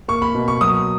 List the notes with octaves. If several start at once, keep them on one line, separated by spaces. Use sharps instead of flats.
A#3 C#6
B5
B2
C#6
F#3 D#6